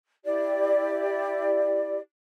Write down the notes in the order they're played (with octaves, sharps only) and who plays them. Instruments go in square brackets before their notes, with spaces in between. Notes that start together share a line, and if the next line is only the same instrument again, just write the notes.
[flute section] E4 G4 D5